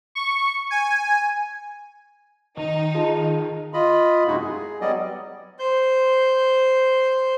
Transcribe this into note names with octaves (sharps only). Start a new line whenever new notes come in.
C#6
G#5
D#3 D#4
F4 G#4 A5
F4 D#5 B5
F#2 C3 G#3 D#4 E4 F#4
G#4
F#3 G3 B3 D5 D#5
C5 G6